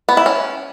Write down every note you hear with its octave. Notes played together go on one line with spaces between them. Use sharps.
B3
E4
C#4